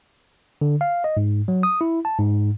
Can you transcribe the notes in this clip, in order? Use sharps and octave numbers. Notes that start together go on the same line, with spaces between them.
D3
F5
D#5
G#2
F#3
D#6
E4
A5
G#2